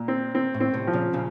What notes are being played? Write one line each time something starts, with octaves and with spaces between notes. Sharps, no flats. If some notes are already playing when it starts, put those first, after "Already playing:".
Already playing: A#2
C4
C4
A2
C4
A2 C3
F3
A#2 C#3
A#2 C#3